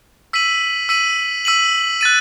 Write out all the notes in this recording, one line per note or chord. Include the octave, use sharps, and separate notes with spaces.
E6 B6 D#7 F#7
E6 B6 D#7 F#7
E6 B6 D#7 F#7
F#6 A6 D#7